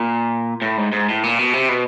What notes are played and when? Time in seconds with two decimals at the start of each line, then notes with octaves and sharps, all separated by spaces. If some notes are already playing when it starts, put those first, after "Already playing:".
Already playing: A#2
0.62 A2
0.77 G#2
0.92 G#2
1.09 A2
1.23 A#2
1.39 B2
1.53 C3
1.69 B2